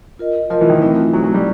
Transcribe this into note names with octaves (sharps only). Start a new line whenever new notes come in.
F4 A#4 D#5
F3 F4 A#4 D#5
E3
D#3
E3 A3 C4 D#4
F#3 A3 C4 D#4
F#3
G3